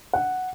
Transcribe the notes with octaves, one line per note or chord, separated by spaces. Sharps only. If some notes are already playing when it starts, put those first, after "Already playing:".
F#5